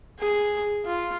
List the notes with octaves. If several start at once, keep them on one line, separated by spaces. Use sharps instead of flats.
G#4
F4